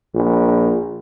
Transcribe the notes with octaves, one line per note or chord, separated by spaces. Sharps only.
A#1